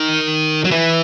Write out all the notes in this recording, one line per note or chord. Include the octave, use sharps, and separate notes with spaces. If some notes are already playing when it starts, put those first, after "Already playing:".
Already playing: D#3
F#3
E3